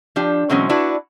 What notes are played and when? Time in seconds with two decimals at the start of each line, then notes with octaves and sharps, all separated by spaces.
0.16 F3 D4 G4
0.50 B2 E3 F#3 G#3 C4 C#4
0.69 D4 E4 F#4 B4